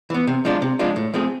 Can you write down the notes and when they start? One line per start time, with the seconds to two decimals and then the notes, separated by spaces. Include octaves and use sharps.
0.10 E3 B3
0.27 C3
0.45 F3 G#3 D4 F4
0.62 C3
0.79 F3 G#3 D4 F4
0.96 A2
1.14 F3 A3 C4 G#4